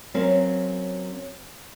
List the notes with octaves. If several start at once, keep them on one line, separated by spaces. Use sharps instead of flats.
F#3 C4 C#4 A#4 F5